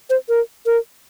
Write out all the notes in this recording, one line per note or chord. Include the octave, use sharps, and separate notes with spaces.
C5
A#4
A#4